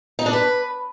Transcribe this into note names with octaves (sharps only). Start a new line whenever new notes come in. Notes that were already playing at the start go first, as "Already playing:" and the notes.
D#4
D4
B4